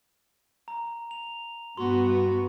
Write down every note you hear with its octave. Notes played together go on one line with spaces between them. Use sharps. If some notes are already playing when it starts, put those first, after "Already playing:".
A#5
F7
G2 B3 F#4 C6